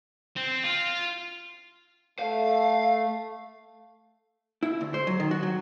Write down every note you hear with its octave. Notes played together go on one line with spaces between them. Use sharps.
C4
F4
A3 F5
E4
D2
C5
F#3
D#3
F#4
F#3